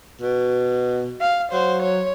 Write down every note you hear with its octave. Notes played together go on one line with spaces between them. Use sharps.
B2
F5
F#3 C5
C#5